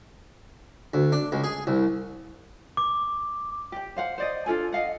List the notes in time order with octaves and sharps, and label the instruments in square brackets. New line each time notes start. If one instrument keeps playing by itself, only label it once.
[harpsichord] D2
D4
C#2
G#4
C2
[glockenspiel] D6
[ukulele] G4 G5
C5 F5 F#5
C5 D5 D#5
D4 F4 A4 G#5
D#5 F5 F#5